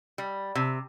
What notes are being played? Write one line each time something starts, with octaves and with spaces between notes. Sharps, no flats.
G3
C3